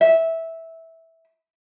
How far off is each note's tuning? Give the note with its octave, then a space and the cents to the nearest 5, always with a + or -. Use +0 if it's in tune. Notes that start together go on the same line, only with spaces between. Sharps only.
E5 -10